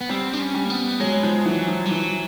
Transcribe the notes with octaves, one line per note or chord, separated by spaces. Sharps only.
B3
G3 C4
D4
C#4
G3
A#3
B3
F#3 G#3
F3
E3 F#3
F3
G3
E3 F#3